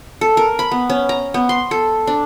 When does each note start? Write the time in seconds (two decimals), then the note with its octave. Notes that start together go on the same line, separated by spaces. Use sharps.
0.21 A4
0.37 A#4
0.59 B5
0.71 B3
0.90 C#4
1.09 A#5
1.34 B3
1.49 C6
1.71 A4
2.07 D4